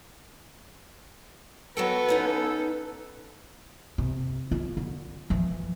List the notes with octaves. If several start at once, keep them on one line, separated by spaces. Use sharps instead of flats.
F#3 B3 F#4 A4 G5
C#4 D#4 B4
C3
F4
D3
E3 F3